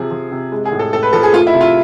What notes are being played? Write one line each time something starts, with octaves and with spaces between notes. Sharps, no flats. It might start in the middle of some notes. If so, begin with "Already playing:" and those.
Already playing: C3 F3 G#4
F3
C3
G#3
G#4
A2
A4
A2 A4
B4
F3 A4
G#4
A3 F4
E4
C3
F4